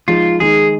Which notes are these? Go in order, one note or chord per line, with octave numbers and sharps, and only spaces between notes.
F3 G#3 D#4 F4
D#3 G#3 D#4 G#4